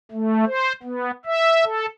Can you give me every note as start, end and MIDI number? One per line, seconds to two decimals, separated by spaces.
0.12 0.45 57
0.47 0.72 72
0.83 1.11 59
1.26 1.64 76
1.65 1.86 69